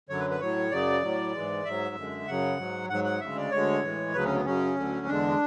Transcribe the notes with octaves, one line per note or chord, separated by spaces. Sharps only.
F#2 D3 F#3 C#5
B4
B4
A2 F#3 C#5
F#2 C#3 F#3 D5
A2 F#3
G#2 E3 G#3
G#2 F#3 E5
F#2 D3 G#3
F#2 C#3 F#3 F#5
G#2 F#3
G#2 F#3 F#5
F#5
D2 C#3 G#3 E5
D5
D2 D3 G#3 C#5
A2 E3 G#3
D2 C#3 F#3 B4
C#4
B3
F#2 C#3 F#3 C#4
D2 D3 F#3
E2 D3 G#3 D4